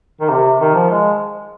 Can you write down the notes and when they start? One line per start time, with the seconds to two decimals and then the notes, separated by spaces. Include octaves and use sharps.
0.20 D#3
0.30 C3
0.61 D#3
0.75 F3
0.90 G#3